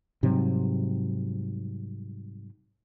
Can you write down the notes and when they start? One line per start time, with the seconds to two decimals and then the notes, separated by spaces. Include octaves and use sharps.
0.23 G#2 C3 F#3 G3